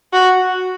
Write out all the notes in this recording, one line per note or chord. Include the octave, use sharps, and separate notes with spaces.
F#4